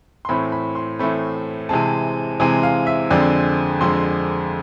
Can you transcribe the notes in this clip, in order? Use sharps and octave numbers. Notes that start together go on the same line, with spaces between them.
C6
A2 E3 A3 C4 B5
B5
C6
A2 E3 A3 C4 B5
C3 E3 G#3 C4 A5
C3 E3 G#3 C4 G#5
F5
E5
F2 D3 G#3 C4 D5
F2 D3 G#3 C4 C6